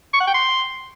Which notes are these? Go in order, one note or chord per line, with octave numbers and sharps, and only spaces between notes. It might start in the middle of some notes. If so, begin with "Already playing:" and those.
C#6
F#5
G5
C6